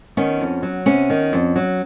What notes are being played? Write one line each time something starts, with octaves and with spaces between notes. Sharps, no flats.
D#3 B3 C#4
F2
F#3
C3 B3 C#4
D#3
F2
F#3